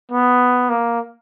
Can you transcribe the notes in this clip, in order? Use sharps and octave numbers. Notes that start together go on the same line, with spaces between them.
B3
A#3